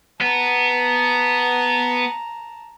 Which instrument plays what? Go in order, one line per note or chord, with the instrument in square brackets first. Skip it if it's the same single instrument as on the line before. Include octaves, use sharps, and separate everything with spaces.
[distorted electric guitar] B3 [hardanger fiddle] A5 A#5